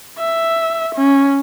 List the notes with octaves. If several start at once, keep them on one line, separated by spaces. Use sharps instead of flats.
E5
C#4